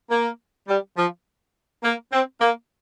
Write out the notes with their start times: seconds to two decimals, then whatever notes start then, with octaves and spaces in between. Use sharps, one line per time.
0.10 A#3
0.68 G3
0.97 F3
1.83 A#3
2.12 C4
2.41 A#3